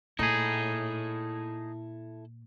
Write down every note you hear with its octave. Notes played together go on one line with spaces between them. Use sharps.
A#2 D#4 E4 G#4 A4